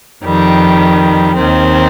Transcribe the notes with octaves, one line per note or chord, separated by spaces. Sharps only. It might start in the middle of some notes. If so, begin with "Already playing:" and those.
F2 D#3 G3
D#2 D#3 C4